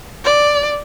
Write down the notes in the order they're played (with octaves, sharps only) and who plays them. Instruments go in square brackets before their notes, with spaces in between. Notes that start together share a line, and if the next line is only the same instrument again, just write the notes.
[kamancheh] D5